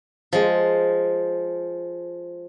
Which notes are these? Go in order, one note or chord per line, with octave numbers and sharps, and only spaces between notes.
F3 G#3